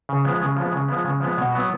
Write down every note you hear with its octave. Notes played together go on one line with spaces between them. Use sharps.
C#3
F3 G#3 B3
C#3
F3 G#3 B3
C#3
F3 G#3 B3
C#3
F3 G#3 B3
B2
F#3 B3 F#4